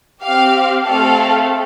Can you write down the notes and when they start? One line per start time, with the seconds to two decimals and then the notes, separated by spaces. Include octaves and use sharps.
0.23 C4 G4 F5
0.85 A3 C4 A4 F5